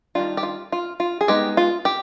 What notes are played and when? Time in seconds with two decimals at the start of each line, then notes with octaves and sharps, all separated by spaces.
0.15 D#3 G3 D4 F4
0.37 G4
0.43 F4
0.72 F4
1.00 F4
1.21 G#4
1.28 G#3 B3 D#4 G4
1.57 F4
1.85 G4